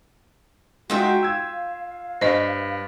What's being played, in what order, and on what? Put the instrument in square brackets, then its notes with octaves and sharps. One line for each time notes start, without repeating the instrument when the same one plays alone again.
[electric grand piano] G#3 D#4 [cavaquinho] F4 E5 G5 [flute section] F#4
[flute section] F5 [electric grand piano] E6 G#6
[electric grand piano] G2 [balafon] C5 D#5